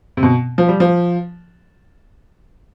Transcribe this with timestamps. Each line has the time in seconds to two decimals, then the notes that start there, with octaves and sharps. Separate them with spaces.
0.17 C3
0.23 B2
0.58 F3
0.68 G3
0.80 F3